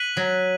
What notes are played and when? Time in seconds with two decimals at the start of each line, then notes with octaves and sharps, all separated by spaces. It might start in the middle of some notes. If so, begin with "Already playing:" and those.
Already playing: F#6 B6 D#7 F#7
0.17 F#3